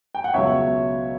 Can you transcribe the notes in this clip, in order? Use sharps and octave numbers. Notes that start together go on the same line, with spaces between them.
G5
F#5
C#2 B2 F#3 C#5 E5